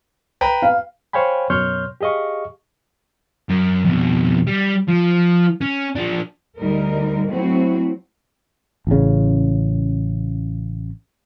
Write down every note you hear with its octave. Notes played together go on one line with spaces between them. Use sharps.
B4 G5 A#5
F5
C5 C#5 F5 G5 G#5 B5
F#2 B2 C#5 C6 F6 G6
G4 G#4 D#5 F5 C#6
F#2
F2 B2
G3
F3
C#4
F3 D4
D2 D3 G3 D#4 A#4
F#3 A3 C4 E4 F#4
A1 C#3